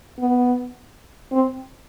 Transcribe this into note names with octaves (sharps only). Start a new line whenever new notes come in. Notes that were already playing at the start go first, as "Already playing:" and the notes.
B3
C4